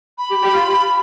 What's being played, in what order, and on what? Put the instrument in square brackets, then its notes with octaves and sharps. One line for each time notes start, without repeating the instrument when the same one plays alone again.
[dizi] B5
[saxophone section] G4
G4
F4